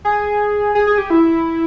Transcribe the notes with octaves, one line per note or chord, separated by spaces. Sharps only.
G#4
G#4
G#4
G4
E4